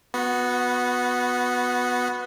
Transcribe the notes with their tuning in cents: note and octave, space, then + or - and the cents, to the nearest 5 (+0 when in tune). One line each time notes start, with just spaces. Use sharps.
B3 +0 F#4 -25